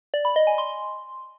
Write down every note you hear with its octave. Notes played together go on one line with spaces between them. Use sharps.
D5
B5
D#5
G#5
C6